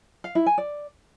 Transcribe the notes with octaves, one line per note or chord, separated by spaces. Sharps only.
F5
E4
G#5
D5